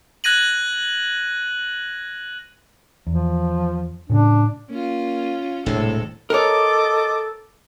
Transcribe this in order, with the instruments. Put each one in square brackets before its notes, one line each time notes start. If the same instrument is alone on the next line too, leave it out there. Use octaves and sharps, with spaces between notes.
[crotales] F#6 G#6 A#6 D#7 F#7
[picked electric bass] E2 [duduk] F3
[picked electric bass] A2 C#3 [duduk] D4
[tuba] A#3 [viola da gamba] C#4 F4
[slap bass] D#1 G#3 [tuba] A2 [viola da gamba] C3 D4 A4
[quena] A4 [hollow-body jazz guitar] A#4 C#5 [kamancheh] D#5 D6